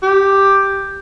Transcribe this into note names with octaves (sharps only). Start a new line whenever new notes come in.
G4